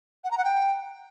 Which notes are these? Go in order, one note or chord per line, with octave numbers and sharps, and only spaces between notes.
F#5
A#5
F#5
G5